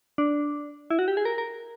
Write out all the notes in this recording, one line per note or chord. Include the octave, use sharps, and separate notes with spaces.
D4
E4
F#4
G4
G#4
A#4
A#4